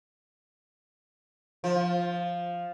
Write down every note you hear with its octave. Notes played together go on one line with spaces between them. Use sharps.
F3